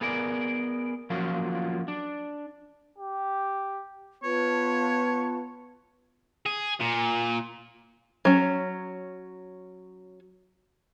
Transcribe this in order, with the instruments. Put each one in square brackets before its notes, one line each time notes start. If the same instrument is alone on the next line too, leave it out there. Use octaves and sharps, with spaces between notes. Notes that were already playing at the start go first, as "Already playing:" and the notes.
[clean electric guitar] B3 G#4 A#4 D5
F3 F#3 A#3 C#4 F4
D4
[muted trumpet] G4
[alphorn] B3 [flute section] F4 B4 A5 [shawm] C#5
[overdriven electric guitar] G#4
A#2
[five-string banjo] F#3 C#4